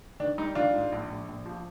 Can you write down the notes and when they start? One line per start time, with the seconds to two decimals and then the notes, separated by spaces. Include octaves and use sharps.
0.20 D#3 D4
0.38 G3 D#4
0.55 D#3 D4 F4
0.74 G#2
0.92 A#1
1.10 A#1
1.28 A#1
1.46 F3